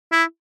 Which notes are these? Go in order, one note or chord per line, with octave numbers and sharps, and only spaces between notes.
E4